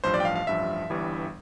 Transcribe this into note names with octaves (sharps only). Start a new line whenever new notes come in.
A1 G2 F3 C5
D5
G5
F5
F5
A1 G2 F3 E5
G1 G2 E3 G3